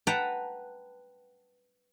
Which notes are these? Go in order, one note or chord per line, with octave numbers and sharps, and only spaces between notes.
B4 F#5 G5 A5 A#5